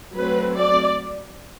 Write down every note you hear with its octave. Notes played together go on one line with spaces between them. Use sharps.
F#3 A3 C4 B4
D5